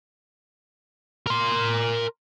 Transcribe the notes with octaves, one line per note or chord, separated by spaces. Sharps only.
A#4 C6